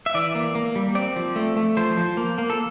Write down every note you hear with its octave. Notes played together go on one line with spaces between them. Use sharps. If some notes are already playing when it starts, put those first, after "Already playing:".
E5
E3 D5
A#3
A#3
G3
C4 D5
F3
A3
A3
F3 C5
F3
A#3
A#3
A4